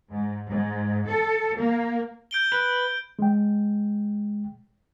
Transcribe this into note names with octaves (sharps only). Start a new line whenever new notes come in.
G#2
G#2
A4
A#3
G6 D7 G7
B4
G#3 G5